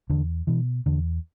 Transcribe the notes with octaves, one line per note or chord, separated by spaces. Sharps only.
E2 D3
B2 E3
E2 D3